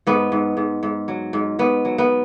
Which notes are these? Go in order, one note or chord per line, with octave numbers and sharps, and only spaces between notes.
G#2 B3
G#2
G#2
G#2
F#3
G#2
G#2 B3
F#3
B3